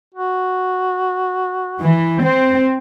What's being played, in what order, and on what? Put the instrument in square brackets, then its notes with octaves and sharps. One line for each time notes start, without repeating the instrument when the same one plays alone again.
[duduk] F#4
[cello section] E3
[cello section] C4 [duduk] C5